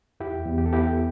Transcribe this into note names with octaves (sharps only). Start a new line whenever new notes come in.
E2 E4 G4
E2
G4
A4
B3 E4 G4